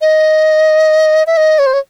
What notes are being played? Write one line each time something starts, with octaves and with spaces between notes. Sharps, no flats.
D#5
E5
D#5
C#5
C5
C#5